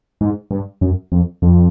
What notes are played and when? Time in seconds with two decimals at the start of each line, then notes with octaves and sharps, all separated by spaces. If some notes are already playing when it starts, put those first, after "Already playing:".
0.21 G#2
0.51 G2
0.81 F#2
1.12 F2
1.42 F2